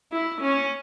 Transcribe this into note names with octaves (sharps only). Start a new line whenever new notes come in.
E4
C#4